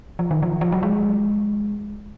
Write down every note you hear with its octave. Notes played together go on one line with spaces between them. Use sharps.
F3
D#3
F3
F3
F#3
G#3